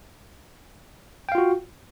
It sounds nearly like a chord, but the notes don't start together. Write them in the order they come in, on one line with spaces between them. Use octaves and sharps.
G5 F5 F4 F#4